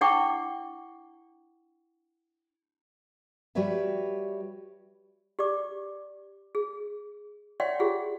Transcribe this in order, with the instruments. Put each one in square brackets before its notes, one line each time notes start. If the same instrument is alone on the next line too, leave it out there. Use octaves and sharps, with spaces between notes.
[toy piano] D4 E4 F#5 G5 C#6 D6
[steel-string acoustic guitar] G3 F#4 G4 B4 C#5 E5
[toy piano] G4 D5 D6
G#4
C#5 D5 E5 F#5 G5 C6
F4 G4 G#4 F#5